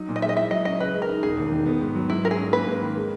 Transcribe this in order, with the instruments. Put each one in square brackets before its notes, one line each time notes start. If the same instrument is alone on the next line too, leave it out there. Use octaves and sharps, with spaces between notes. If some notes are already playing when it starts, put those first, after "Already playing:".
Already playing: [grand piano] F#3 D#4
A#2
[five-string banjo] D#5
[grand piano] G#3 [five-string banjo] E5
[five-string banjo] D#5
[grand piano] E4 [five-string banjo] E5
[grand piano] F#3 [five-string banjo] D#5
[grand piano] C#4 [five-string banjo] D#5
[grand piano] C#3 [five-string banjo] B4
[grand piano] G#3
[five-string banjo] A#4
[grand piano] D#4
[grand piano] E1 [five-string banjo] G#4
[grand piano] D#2
D#3
B3
G#2
F#3
[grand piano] G#2 [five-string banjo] E4
[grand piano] F#3 [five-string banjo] A#4
[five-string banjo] G#4
[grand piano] C#4
[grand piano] A#3 [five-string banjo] B4
[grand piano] G#2
D#3
G#3